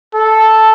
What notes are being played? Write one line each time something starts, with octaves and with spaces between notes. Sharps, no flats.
A4